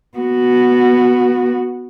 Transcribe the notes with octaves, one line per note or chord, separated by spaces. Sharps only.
B3 F#4